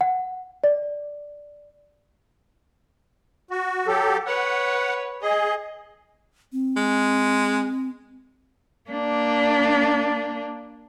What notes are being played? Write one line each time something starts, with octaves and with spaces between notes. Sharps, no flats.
F#5
D5
F#4
F#3 G4 A4
B4 C#5 F#5
G#4 D#5
C4
G#3
A#3 D4